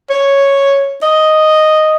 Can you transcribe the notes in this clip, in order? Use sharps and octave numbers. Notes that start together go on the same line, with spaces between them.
C#5
D#5